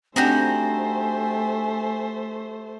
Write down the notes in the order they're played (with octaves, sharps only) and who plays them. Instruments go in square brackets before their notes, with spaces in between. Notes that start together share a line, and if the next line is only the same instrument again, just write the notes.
[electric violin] A3 C5 [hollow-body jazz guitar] C4 D4 [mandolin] D#4 F#4 G4 [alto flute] G#5